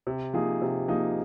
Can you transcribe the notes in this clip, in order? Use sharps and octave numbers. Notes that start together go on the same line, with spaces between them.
C3
F3 A#3 D#4 G#4
C3
F3 A#3 D#4 G#4